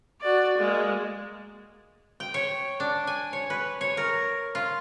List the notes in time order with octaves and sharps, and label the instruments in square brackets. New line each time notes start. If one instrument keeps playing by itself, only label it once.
[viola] F#4 D5
G#3 A#3
[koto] G5
C#5
D4
G#5
C#5
B4
C#5
A#4
F4